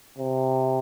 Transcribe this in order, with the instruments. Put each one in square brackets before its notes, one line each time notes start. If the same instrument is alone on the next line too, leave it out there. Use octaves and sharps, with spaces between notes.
[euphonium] C3